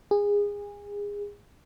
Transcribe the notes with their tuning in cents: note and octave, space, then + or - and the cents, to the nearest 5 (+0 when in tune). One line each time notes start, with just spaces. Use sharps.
G#4 -25